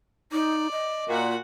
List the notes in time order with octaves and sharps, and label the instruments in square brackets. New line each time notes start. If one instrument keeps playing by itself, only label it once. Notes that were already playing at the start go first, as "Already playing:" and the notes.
[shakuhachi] D#4 [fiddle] D5
[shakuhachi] D#5
[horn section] A#2 [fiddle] F#4 F#5